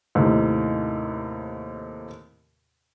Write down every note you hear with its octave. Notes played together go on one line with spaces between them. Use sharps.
D#2 A2 C3 D#3